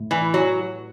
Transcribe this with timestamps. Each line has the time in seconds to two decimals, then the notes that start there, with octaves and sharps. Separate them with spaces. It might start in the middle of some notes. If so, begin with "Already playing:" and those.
Already playing: A2
0.11 E3
0.34 F#3